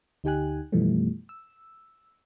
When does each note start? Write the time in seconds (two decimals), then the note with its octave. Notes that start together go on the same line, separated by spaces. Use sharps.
0.24 D2 D#4 G4 G5 G#5 F#6
0.72 F#2 B2 E3 F3 G3 A3
1.29 E6